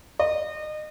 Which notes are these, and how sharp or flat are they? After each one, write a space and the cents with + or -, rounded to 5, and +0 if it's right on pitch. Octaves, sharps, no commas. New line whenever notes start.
D#5 -30